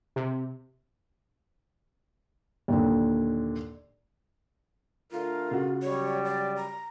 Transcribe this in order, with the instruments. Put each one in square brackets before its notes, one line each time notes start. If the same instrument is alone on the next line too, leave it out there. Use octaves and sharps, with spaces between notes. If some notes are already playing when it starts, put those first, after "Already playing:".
[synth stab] C3
[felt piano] D#2 A#2 D3
[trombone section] D3 A3 A#4 [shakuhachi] F4
[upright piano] C#3 F#4
[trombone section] F#3 G3 [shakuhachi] C#5
[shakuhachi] D5
A#5